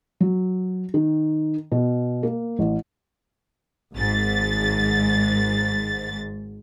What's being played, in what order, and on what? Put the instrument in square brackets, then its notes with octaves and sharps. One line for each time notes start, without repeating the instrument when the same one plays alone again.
[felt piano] F#3
D#3
B2
A#3
A1
[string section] G#1 G#2 A6